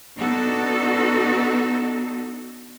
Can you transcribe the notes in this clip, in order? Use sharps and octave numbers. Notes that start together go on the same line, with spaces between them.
B3 D4 D#4 F#4 A4